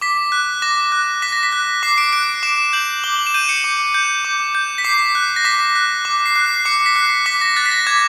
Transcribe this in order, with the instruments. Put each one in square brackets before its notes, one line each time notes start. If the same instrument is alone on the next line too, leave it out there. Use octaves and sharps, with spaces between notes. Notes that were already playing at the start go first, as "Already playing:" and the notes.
[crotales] D6 B6
F#6
D6 A#6
F#6
D6 B6
A#6
B6
F#6
D6 C7
D7
F#6 D7
D6 E7
G6 F#7
D6 G7
F#7
E7
G6 D#7
C#7
D6
G6
D6
G6
B6
D6 C7
F#6
A#6
D6 B6
F#6
D6
C7
F#6
C7
D6 C#7
B6
F#6 C7
D6 B6
A#6
F#6 A6
B6
A#6
D6 G#6